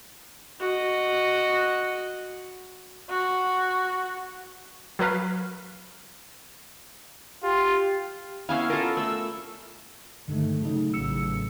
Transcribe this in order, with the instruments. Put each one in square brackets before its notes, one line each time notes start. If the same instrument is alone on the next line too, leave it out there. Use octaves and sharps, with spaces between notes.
[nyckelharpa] F#4 D#5
[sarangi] F#4
[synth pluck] F#3 A#4 B4 F5
[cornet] F4 [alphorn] G4
[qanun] B3 C#4 E4 [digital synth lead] F5
[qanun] F4 A4 [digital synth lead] A#4
[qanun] A3 [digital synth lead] E6
[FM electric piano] G2 D3 [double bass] D#3 A3
[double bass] C#3 [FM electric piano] F#3 A3 D#4
[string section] A1 [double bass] C#3 [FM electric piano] F#3 E6 C#7